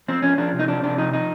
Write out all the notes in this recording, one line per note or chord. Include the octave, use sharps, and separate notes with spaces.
F3 C4
F3 C#4
F3 D4
C3
D#4
F3 D4
C3 D4
F3 D#4
F3 D#4